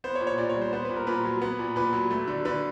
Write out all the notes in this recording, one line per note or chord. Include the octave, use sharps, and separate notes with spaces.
B3 C5
C#5
A#2
C#5
A#2 D5
C#5
G3
C5
B3 C5
A#2 B4
A#4
A#2 B4
F#3
B3
A#2
A#2 B4
F#3
A3
D3
D3 B4